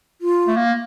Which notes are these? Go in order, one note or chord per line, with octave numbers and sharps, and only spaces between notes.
F4
A3
A#3